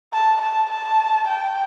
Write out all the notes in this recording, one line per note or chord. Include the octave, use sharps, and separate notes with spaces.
A5
A5
A5
G5